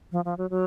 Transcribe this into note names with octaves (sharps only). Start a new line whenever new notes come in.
F3
F3
F#3
F#3